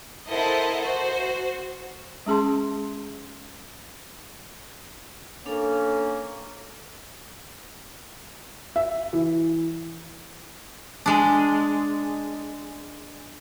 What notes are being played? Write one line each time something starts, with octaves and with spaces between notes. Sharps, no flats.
E4 A4 A#4 C5 D#5 F#5
F#4 C5
G#3 C#4 G#4 A5 C6
A#3 C#4 D4 A4
E5
E3
G#3 D4